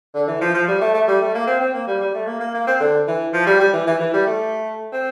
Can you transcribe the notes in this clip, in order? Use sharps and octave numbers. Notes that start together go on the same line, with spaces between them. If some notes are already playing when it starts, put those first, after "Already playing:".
D3
E3
F3
F3
G3
A3
A3
G3
A3
A#3
C4
C4
A#3
G3
G3
A3
A#3
A#3
A#3
C4
D3
E3
F3
G3
G3
E3
E3
E3
G3
A3
C4